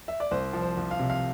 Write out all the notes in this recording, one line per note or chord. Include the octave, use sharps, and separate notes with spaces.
E5
D5
C2 C5
F3
C5
C2
F5
C3
F5